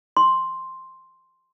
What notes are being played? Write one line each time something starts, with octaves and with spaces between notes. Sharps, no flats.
C6